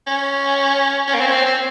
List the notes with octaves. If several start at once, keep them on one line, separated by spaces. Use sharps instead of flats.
C#4
C#4
A#3
C4
C#4
C4
C4